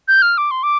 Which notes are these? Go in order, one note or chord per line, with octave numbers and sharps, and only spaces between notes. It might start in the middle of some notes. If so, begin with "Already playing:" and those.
G6
F6
D6
C6
D6